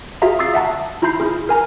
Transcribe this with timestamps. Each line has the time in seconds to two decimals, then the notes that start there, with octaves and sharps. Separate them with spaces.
0.22 F4 F#4 G#4 E5 F5 A#5
0.39 C#6 D#6 E6 A6 C7
0.54 E5 F#5 A5 A#5
1.02 E4 F4 A#5 B5 G6 C7
1.20 E4 G#4
1.49 A#4 G#5 A#5